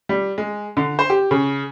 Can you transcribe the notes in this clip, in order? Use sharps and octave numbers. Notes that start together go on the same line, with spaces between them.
G3
G#3
D3
C5
G4
C#3